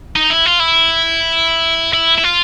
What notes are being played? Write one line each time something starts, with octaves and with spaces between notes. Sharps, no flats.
D#4
E4
F4
E4
E4
E4
F4